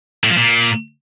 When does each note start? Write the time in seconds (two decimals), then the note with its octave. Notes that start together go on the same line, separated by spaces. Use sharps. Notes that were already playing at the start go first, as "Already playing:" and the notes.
0.24 A2
0.30 F3
0.37 A#2